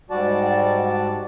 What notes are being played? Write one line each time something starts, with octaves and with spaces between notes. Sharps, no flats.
G#2 G3 F#4 D5 A5